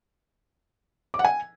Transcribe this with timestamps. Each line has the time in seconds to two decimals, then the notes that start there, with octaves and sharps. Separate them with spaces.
1.14 D6
1.19 F#5
1.25 G#5